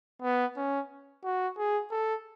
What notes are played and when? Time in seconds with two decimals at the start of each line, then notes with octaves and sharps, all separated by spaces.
0.22 B3
0.56 C#4
1.24 F#4
1.58 G#4
1.91 A4